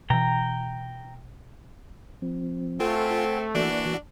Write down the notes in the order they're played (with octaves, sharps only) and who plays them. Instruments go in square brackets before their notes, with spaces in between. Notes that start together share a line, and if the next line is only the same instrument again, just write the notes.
[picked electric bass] B2 E3 [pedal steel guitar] G5 A#5
[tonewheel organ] F3 C4
[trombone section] A3 [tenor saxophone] C4 [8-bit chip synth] F4 [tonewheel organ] A4 F#5 G#5
[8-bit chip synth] E3 F#4 [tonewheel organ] A#3 D5 [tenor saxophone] D4